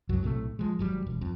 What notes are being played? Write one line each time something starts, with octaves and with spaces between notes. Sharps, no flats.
C2 F#2 F#3
B1 A2 C3 A3
F3 G#3
G#1 F#3 G3
E1
F2